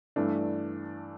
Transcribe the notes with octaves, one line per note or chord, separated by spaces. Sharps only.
G2 E3 A3 D4